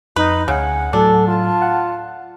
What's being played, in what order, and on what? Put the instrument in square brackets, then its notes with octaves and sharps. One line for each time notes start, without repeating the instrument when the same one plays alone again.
[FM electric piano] F2 [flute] D#4 [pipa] B4
[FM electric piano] D2 [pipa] C#3 [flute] F#5 [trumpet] G#5
[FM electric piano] A2 F#3 [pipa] D4 [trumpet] A4
[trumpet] F4 [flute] A5
[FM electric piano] F5 F#5